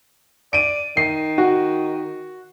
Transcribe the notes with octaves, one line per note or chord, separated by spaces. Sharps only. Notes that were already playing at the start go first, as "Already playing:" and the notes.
D5 D7 D#7
D#3 C7
F#4